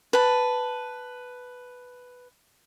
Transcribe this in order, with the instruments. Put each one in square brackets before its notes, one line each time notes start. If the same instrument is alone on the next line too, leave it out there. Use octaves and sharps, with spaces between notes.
[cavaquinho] B4 A5